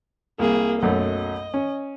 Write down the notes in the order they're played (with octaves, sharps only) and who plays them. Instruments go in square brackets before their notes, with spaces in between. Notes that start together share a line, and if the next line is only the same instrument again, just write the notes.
[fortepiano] C2 [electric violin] A#3 G#4
[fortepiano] B1 F#2 A3 [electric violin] D#5
[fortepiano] C#4